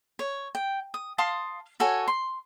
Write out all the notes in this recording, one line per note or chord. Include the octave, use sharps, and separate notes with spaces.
C#5
G5
D#6
F5 A5 C6 D#6
F#4 A4 C#5 G#5
C6